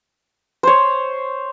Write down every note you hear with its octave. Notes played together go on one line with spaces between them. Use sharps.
C5 C#5